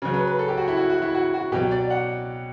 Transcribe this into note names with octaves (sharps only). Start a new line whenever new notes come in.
C#3 F#3
B4
B4
A4
G4
F#4
E4
F#4
F#4
E4
F#4
F#4
B2 F#3 G4
D5
F#5